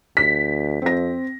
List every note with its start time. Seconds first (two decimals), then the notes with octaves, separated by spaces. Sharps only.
0.17 D2 B6
0.82 F2 C4 A#6